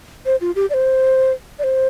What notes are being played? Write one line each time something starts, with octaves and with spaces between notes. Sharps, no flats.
C5
F4
G4
D5
C5
D5
C5